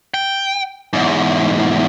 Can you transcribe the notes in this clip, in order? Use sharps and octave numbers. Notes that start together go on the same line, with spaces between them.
G5
E2 G#2